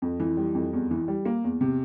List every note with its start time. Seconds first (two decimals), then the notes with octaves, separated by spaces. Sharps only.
0.02 F2
0.20 E3
0.37 G3
0.55 F2
0.73 E2
0.91 E3
1.08 G3
1.25 A#3
1.44 E2
1.61 C3